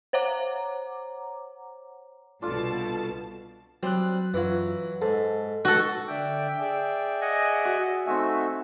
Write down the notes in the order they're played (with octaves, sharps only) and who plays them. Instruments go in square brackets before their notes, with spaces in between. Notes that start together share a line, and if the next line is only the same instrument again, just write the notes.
[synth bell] C5 C#5 F#5 A#5 D6
[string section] C2 B2 A5 [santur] D4 F4 A4
[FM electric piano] F#3 F#6 [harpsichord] G3 C4
[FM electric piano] F#2 F4 [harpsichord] E3 F#3
[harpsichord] G#2 [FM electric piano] A4
[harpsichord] C#2 [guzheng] F#4 A4
[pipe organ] D3 D5 E5 [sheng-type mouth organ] G5
[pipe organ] G#4 D5 E5
[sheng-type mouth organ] D#5 F#5 G#5
[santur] F#4
[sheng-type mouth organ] A3 F#4 E5 [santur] C4 G#5 [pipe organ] D#4